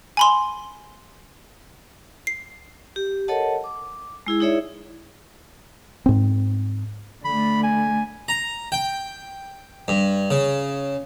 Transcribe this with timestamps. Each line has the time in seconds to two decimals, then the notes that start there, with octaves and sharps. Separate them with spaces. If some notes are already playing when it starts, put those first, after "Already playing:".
0.17 G#5 B5 C6
2.27 C7
2.96 G4
3.28 A4 A#4 C#5 D#5 F#5 A5
3.64 D6
4.27 G#3 E4 G#4
4.40 D#4 E4 G#4 C#5 D5 E5
6.06 G#2 C4
7.25 D3 A3 B5
7.63 G#5
8.28 A#5
8.72 G5
9.88 G2
10.31 C#3